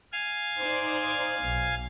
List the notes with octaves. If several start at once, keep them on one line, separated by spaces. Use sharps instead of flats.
F5 G#5
D#4 C5 D5
B1